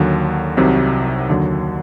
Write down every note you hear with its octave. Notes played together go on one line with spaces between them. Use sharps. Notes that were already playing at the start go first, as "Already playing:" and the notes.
Already playing: D#2 D3 F#3
C2 C3 D#3 F#3
D#2 D3 F#3